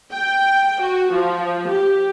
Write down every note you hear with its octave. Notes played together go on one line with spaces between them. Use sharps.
G5
F#4
F3
G4